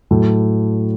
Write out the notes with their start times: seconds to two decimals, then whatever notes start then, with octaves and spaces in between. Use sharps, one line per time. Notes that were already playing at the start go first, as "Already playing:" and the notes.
0.11 A2 F#3